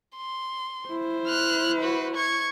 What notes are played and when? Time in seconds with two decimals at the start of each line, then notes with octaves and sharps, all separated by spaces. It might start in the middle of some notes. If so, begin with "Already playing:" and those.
0.17 C6
0.89 E4 C5
1.27 F6 F#6
1.81 F#4 B4
2.16 C#6 G#6